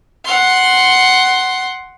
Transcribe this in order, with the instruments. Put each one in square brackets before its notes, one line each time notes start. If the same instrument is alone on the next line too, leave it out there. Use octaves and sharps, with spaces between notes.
[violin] F#5 C6